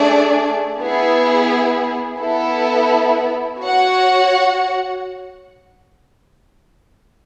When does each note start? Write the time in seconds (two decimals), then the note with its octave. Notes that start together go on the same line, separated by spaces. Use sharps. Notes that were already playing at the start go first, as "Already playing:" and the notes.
Already playing: A3 D4 G#4 D5
0.79 B3 E4 G#4
2.19 B3 E4 A4
3.60 F#4 C#5 F#5